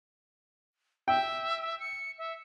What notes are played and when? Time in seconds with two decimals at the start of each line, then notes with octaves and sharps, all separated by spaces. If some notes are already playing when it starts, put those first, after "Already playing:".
1.08 E5 G5
1.80 C#7
2.18 E5